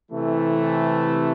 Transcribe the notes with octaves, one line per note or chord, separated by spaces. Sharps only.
C3 E3 A3